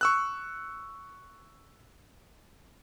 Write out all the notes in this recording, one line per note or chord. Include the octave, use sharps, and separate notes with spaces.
C#6 E6 F#6